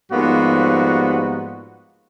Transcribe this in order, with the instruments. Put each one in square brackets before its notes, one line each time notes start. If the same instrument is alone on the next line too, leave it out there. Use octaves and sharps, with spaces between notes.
[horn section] G#2 F3 G3 A#3 B3 F#4